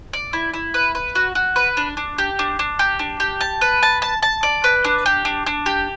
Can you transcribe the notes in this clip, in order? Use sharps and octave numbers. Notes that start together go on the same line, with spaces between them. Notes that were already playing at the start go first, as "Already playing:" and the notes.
D5
E4
E4
B4
B4
F#4
F#4
B4
D4
D4
G4
D4
D4
G4
D4
G4
A5
B4
A5
A5
A5
D5
B4
D4
G4
D4
D4
G4